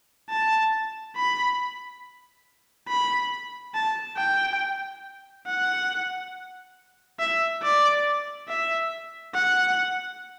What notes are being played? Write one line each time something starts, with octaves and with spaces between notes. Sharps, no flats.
A5
B5
B5
A5
G5
F#5
E5
D5
E5
F#5